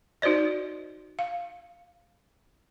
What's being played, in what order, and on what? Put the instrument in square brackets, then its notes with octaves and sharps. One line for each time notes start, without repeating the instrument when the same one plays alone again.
[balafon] D#4 F#4 C5 D5 D#5
F5